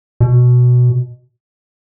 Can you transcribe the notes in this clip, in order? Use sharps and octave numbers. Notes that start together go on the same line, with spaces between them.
B2